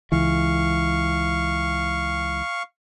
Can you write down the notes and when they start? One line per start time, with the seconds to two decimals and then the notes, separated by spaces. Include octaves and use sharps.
0.12 C#2 E3 F5 C#6